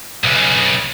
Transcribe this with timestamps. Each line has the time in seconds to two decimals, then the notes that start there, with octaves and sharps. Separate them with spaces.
0.24 B1 C#3